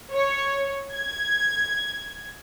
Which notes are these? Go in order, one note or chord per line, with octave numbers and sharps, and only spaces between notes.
C#5
G#6